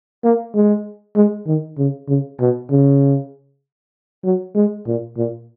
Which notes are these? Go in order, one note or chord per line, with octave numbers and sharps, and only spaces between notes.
A#3
G#3
G#3
D#3
C#3
C#3
B2
C#3
F#3
G#3
A#2
A#2